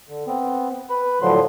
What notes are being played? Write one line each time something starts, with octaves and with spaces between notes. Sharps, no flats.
D3
B3 C4
B4 B5
A2 D3 F3 F#3 C6